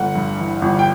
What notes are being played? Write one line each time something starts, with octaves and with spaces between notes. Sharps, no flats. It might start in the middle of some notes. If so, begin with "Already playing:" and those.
Already playing: G1 A3 F#5
G2
E3
G1
G5